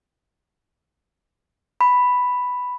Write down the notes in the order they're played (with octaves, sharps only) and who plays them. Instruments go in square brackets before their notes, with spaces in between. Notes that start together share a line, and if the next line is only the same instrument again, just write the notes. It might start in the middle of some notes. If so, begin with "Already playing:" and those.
[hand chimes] B5